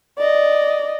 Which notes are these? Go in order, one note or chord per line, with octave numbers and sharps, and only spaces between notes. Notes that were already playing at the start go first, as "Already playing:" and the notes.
D5 D#5